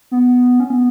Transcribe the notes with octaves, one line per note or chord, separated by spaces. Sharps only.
B3
C#4
B3